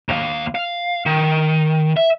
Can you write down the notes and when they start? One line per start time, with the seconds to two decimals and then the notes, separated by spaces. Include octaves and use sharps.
0.09 D#2 F5
0.55 F5
1.06 D#3
1.97 E5